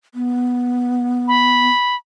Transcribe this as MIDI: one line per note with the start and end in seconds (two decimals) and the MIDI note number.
0.15 1.69 59
1.28 1.96 83